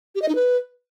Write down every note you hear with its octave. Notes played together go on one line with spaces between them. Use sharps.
G4
D#5
D#4
B4